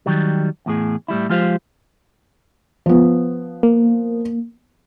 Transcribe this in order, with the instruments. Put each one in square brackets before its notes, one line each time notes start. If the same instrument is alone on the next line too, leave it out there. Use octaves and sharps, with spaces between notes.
[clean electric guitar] D#3 F#3 G3
E2 A2 G#4
A2 G3 E4
F3 G#3 F4 G4 C5 F5
[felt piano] F3 B3
[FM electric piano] A#3